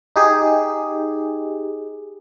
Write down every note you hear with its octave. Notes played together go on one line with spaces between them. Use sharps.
D#4 G4 G#4